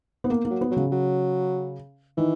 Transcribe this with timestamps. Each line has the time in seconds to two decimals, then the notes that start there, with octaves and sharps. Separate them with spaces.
0.24 B3
0.30 A#3
0.45 A#3
0.50 F#3
0.61 B3
0.71 F#3
0.76 C#3
0.92 F#3
2.17 D#3 E3